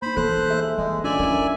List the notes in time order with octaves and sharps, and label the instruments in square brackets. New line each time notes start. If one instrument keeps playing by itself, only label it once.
[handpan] A#3 D#4 [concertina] C5 B5
[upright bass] E3 A#3 [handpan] A4 [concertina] C5 F#6
[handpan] G#4 E5
[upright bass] E3 [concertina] G#3
[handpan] C#4 D4 F4 [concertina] D5 E5 G#5
[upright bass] D#4 E4 [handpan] A#4